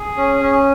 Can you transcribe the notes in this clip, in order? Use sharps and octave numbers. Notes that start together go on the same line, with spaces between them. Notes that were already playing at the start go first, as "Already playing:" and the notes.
Already playing: G#4
C#4
C#4